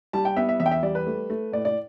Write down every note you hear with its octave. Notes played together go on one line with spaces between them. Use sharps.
G3 A5
G5
B3 E5
E5
E2 E5
G5
E5
G3 D5
B4
A3
A3
A2 D5
D5